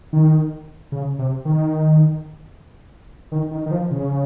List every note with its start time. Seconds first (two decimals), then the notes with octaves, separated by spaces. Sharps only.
0.13 D#3
0.92 C#3
1.19 C3
1.45 D#3
3.32 D#3
3.51 D#3
3.66 D#3
3.71 F3
3.91 C#3